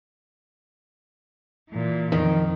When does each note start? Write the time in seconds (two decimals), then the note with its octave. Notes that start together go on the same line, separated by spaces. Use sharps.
1.69 A#2 E3
2.12 F2 D#3